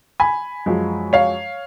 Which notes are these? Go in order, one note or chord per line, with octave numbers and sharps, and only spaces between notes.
G#5 B5
F#2 F3 G#3
C#5 F5